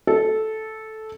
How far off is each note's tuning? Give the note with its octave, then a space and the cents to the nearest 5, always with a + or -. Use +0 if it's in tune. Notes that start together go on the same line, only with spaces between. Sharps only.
A4 -10